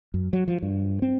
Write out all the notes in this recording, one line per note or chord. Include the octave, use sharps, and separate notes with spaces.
F#2
F#3
F3
G2
C4